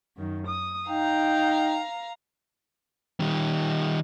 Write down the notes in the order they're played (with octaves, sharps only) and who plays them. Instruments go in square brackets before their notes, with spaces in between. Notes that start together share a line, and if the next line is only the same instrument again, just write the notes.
[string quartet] F#2 D#3
D#6
[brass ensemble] D#4 G5 [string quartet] F5 A#5
[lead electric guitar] D#3 G3